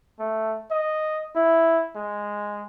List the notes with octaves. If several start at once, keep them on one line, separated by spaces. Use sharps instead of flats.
A3
D#5
E4
G#3